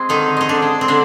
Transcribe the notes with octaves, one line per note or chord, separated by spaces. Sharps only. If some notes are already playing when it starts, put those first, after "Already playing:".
Already playing: G#3 C4
D3 D#3 D#4
G#3 D#4
D3 D4
G#3
C4
D3 G3 D4